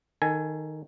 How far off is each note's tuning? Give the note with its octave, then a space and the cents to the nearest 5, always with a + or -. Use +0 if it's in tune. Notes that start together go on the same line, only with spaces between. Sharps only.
D#3 +0 A4 +20 G#5 +5